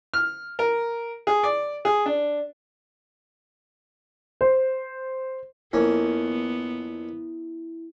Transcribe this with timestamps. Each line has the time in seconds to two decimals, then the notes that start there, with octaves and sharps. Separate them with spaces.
0.14 F6
0.59 A#4
1.27 G#4
1.43 D5
1.85 G#4
2.06 D4
4.41 C5
5.73 F2 A#3 B3 C#4 E4